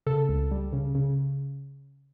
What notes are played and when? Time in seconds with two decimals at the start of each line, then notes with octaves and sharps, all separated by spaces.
0.06 C#3 A4
0.29 C#2
0.51 G3
0.73 C#3
0.95 C#3